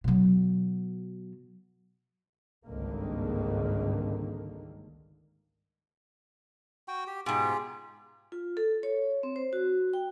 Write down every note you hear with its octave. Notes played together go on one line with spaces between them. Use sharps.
B2 F#3
G#1 C#2 G2 D3 D#3 A#3
F#4 G5
G4
G#2 B2 F4 G4 G#4
F4
A4
C#5
C4
C5
F#4
G5